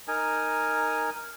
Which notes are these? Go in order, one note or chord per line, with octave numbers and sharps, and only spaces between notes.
D#4 A#4 G#5